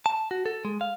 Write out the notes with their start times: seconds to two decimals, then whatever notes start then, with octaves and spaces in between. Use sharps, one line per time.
0.06 A5
0.31 F#4
0.46 A4
0.65 G#3
0.81 F5